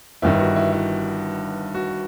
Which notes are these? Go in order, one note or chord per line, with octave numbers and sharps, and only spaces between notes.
G1 G2 D#3 E4
F#4
E4
E4
F#4